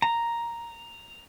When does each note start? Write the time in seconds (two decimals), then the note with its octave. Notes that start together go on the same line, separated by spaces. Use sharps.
0.02 A#5